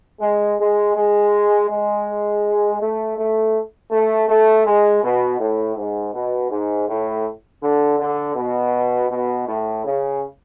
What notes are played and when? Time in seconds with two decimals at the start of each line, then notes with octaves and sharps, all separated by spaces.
0.21 G#3
0.59 G#3
0.96 G#3
1.69 G#3
2.81 A3
3.17 A3
3.91 A3
4.28 A3
4.66 G#3
5.03 B2
5.39 A2
5.76 G#2
6.14 B2
6.50 G#2
6.88 A2
7.62 D3
7.99 D3
8.36 B2
9.10 B2
9.47 A2
9.85 C#3